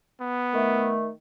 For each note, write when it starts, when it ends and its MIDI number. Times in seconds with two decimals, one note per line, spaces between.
0.20 0.97 59
0.53 1.09 51
0.53 1.09 57